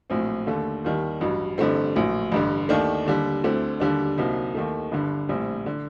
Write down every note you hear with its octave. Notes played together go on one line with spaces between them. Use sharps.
A#1 A2 F#3 C4
D#2 D3 A3
D#2 D#3 G3
A1 G2 F#3
A1 G2 D3 A3 C4
A#1 A2 F#3
A1 G2 D3
D#2 D#3 A3 D4
D#2 D3 G3
D2 D3 A3 C4
D#2 D3 G3 D4
C2 C3 F#3 A#3 D#4
D#2 D#3 A3
G1 G2 D3
A#1 A2 G3 C4
D3